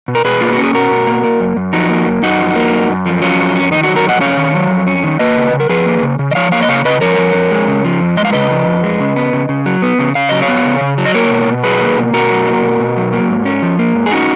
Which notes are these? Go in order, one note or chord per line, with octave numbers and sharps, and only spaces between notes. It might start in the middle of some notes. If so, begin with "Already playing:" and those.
B2
A#4
B2 G#4 B4
A#3 F4
F#4
C#4
G#4
B2 F#4 A#4
B2
A#3
A#3
F#2
F#2
F3 D#4 F#4
A#3
F#2
F#2 D#4 F#4
F3
A#3
F#2
F#2
F3
F#3 C#4 F4
F2
C#4
D#3 D#4
D#4 F#4
F#3
F#4 A#4
F2 D#5 F#5
C#4 C#5 F5
D#3
F#3
F2
C#4
D#3
A#3 B4 D#5
C#3
C#3
A#4
F3 G#4 B4
A#3
C#3
C#3
D#5
F3 C#5 F5
A#3 C#5 F5
D#5
C#3 C#5 F5
C#3 B4 D#5
F3 A#4 C#5
F3
F2
G#3
C#3
F3
F2
G#3 D#5
F5
C#3 B4 D#5
F3
F2
G#3
C#3
B3
C#3
C#3
F#3
B3
C#3
C#3 F5
F#3 D#5
C#5 F5
B3
C#3
C#3
F#3
D#5
A#3 A#4 C#5
B2
B2
F#3 G#4 B4
A#3
B2
B2 F#4 A#4
F#3
A#3
B2
B2
F#3
A#3
G#2
C#4
F3
A#3
G#2
G#4
C#4 D#4 F#4